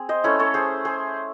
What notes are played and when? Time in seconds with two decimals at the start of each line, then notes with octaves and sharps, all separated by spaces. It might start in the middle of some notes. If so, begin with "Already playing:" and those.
Already playing: C4 G#4
0.09 C5 D#5
0.24 A3 C#4 E4 C#5 E5
0.39 A4 C#5
0.54 G#4 C5
0.85 G#4 C5